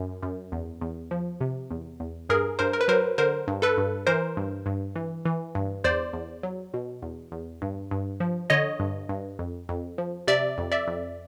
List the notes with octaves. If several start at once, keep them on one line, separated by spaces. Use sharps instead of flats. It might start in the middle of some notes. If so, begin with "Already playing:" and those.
Already playing: F#2
F#2
E2
E2
F3
C3
E2
E2
G2 G#4 A#4
G2 A#4 C5
A#4
B4
F#3 A#4 C5
D3 A#4 C5
G2
A4 B4
G2
E3 A#4 C5
G2
G2
E3
E3
G2
E2 C5 D5
E2
F#3
B2
E2
E2
G2
G2
F3
D3 C#5 D#5
G2
G2
F2
F2
F3
C3 D5 E5
F2
D5 E5
F2